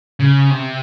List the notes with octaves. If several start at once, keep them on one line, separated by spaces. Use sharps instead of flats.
C#3
C3